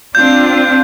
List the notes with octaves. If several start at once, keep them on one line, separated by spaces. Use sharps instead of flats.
C4 D4 F4 G6